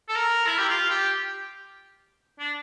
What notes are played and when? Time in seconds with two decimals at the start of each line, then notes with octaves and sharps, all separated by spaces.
0.09 A4
0.16 A#4
0.47 E4
0.58 G4
0.69 F4
0.90 G4
2.39 D4